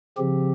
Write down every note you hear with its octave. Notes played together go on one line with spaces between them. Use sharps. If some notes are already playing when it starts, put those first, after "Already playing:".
C#3 F3 C4 G4